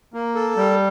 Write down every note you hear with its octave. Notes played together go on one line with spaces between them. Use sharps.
A#3
A4
G3